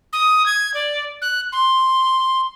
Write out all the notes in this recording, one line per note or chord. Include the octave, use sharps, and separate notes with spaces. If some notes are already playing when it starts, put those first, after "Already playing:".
D#6
G#6
D5
F#6
C6